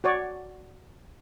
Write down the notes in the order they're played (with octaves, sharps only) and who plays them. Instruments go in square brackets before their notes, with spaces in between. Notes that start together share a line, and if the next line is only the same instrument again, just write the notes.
[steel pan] F#4 C#5 D5